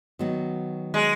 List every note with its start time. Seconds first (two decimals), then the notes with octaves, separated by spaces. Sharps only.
0.19 D#3 F#3 B3 F#4
0.94 G#3